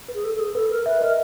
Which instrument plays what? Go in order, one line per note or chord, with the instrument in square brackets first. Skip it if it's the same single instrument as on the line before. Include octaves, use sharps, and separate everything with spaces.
[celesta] B4
[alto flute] G#4
A4
A4
G#4
[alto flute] A4 [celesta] B4
[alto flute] A#4
[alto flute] B4 [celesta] E5
[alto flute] A#4 [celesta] D#5